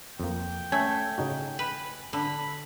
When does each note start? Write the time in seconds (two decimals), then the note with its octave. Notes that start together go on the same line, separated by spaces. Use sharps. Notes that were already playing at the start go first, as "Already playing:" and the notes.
0.20 F2 A#3 G5
0.72 A3 C#4 G#5 G#6
1.18 C#3 D#4 F#4
1.59 B4
2.13 D3 B5